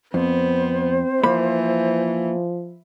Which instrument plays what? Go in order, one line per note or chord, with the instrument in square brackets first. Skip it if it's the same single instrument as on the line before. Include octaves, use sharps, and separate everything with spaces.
[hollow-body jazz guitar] F2 [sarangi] B3 [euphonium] C4 [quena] C5
[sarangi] E3 [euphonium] F3 [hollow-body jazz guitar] A#3 B5